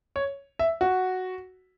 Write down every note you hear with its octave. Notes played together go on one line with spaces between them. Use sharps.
C#5
E5
F#4